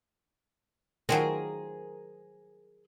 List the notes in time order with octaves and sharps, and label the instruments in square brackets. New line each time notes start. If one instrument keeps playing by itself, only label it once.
[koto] D#3 F3 F#3 [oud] G#4 A#4 C5